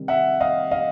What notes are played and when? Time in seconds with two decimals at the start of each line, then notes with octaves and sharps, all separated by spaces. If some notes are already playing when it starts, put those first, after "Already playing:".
Already playing: C3 D#3 G3
0.08 E5 F#5
0.40 D#5 F5
0.71 D#5 F5